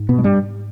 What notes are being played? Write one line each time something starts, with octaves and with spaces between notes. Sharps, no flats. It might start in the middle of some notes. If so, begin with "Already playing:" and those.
Already playing: G#2
B2 B3
G#3
G2 G3